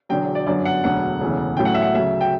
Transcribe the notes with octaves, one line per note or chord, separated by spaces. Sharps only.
E1 E2 D3 F#3 G5
D5
G1 F#2 D3 F#3 D5
F#5
E1 D2 D3 F#3 F#5
E1 D2 C#3 E3
A1 A2 F#3 G5
F#5
E5
F#5
D2 C#3 F#3 E5
G5